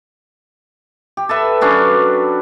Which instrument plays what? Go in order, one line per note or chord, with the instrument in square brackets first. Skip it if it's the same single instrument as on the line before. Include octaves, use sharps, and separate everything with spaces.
[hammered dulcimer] G4
A4 B4 E5
F#3 C#4 D4 B4